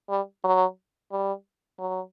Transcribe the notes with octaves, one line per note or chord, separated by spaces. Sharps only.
G3
F#3
G3
F#3